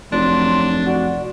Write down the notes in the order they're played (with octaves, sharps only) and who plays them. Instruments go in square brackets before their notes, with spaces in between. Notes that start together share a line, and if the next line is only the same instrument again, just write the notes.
[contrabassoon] F1 [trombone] F#3 [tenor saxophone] D4 [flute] C6
[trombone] F#4 [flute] D5